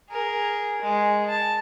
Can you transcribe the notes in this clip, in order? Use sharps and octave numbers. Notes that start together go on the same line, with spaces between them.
G#4 A#4
G#3
A5